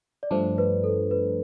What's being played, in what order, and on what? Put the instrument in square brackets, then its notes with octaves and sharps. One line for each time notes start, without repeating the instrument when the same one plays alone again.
[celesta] D5
[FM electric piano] G2 F3 A3 D4 [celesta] C5
[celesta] B4
A4
B4